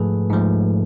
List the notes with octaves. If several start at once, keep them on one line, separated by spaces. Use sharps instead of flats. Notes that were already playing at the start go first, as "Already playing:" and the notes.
Already playing: G#2 F3 A3 G#4 A4 B4
G#2 F3 A3